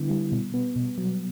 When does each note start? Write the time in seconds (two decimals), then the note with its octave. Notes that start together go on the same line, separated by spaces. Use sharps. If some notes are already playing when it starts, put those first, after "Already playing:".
Already playing: D3 G3 B3 E4
0.10 G3
0.32 B2
0.54 B3
0.76 B2
0.98 F#3